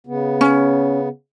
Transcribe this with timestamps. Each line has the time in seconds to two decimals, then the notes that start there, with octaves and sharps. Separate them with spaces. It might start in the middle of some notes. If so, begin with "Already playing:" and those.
0.07 C#3 B3
0.41 C#4